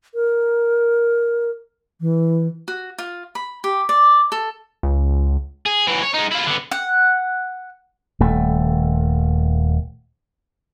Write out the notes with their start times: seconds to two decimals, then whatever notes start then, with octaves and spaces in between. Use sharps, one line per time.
0.15 A#4
2.01 E3
2.68 F#4
2.98 F4
3.35 B5
3.64 G4
3.89 D5
4.32 A4
4.83 C#2
5.66 G#4
5.87 E3 F#3
6.02 C#5
6.14 G#3 D#4
6.31 E4 F4
6.46 D3 B3
6.72 F#5
8.20 D#1 A3